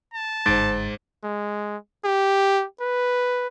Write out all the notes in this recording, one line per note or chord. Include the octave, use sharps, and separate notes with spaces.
A5
G1 G#2 D#4 C5 A6 D7
G#3
G4
B4